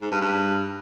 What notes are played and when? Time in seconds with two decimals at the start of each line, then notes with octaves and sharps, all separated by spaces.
0.01 G#2
0.11 G2
0.21 G2